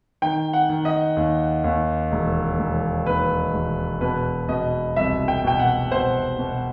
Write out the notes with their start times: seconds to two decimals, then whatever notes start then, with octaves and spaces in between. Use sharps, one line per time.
0.22 D#3 G5
0.53 F#5
0.69 D#3
0.85 D#5
1.17 D#2
1.64 D#2
2.12 E1
2.59 E1
3.06 D#2 B4
3.54 E1
4.01 B2 B4
4.49 B2 D#5
4.96 C2 E5
5.28 G5
5.44 B2 G5
5.59 F#5
5.91 B2 C5
6.39 B2